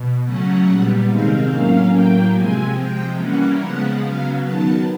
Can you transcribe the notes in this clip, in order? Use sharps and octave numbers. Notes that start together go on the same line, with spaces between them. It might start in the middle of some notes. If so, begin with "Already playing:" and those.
Already playing: B2
C#3 F#3 A3 C#4 F#5
A#2 G3 B3
C3 D#3 G#3 C4 F5
A2 F#3 A#3 C#4 F5
A2 F#3 A#3 G5
C3 F3 G#3 C4 G#5
C3 F3 G#3 G5
E3 G3 A#3 C#4 F#5
C#3 F3 G#3 B3 F#5
C#3 F#3 B3 F5
D#3 F#3 B3 A5